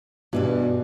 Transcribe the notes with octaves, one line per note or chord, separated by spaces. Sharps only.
G2 B2 E3 G3